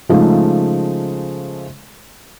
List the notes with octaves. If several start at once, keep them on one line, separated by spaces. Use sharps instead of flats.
C#3 F3 G#3 A3 D#4